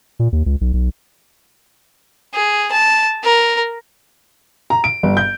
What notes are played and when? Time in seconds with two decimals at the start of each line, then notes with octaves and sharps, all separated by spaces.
0.19 A#2
0.32 D#2
0.46 C#2
0.61 B1
0.73 B1
2.35 G#4
2.72 A5
3.24 A#4
4.70 A#5
4.84 D7
5.03 G1
5.17 G6